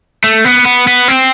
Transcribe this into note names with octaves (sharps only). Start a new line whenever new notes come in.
A3
B3
B3
B3
C4